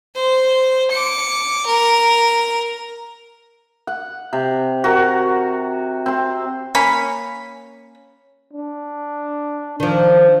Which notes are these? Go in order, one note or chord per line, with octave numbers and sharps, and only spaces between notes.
C5
D6 C#7
A#4
F#5
C3
F#4 A#4
C4 C6
A#3 C#4 B5
D4
D#3 F3 D4